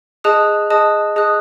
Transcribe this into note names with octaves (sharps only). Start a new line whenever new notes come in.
G#4 D#5 A5 D#6 F#6
G#4 D#5 A5 D#6 F#6
G#4 D#5 A5 D#6 F#6